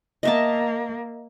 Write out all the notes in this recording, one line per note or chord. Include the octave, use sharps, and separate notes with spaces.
A#3 D#5 E5 A5